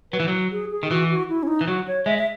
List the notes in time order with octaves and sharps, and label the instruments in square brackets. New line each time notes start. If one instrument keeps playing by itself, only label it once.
[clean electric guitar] F#3 [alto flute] B4
[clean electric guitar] E3
F#3
[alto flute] G#4
G#4
[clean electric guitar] D#3
[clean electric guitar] E3 [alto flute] F#4
[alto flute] F#4
E4
C#4
D#4
[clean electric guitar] E3
[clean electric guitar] F#3 [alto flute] F#4
[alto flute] C#5
[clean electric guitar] G#3 [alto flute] E5
[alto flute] E5